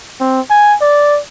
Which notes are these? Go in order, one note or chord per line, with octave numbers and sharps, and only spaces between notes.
C4
G#5
D5